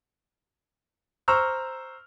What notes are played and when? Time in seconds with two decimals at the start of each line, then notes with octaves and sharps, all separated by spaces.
1.28 C5 A#5 C#6 E6 F6